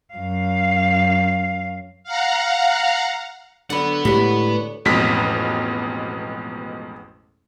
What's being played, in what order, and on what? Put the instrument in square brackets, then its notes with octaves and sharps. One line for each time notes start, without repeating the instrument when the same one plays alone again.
[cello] F#2 F5
[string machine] F5 F#5 A#5
[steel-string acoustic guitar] D3 F#3 [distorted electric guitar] B4 F#5
[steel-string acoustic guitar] D2 C#5 [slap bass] A2 G#3 [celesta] E4 G4 B6
[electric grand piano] A1 F2 B2 G#3 B6